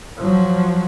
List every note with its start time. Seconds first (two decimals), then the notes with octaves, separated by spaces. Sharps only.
0.18 F3 F#3